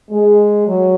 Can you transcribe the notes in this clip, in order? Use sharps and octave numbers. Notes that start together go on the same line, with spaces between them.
G#3
F#3